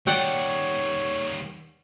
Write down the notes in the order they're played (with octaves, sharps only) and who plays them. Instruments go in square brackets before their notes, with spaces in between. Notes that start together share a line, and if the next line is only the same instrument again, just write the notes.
[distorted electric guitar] D#3 G3 [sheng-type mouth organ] C#5 [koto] D5 F#5 G5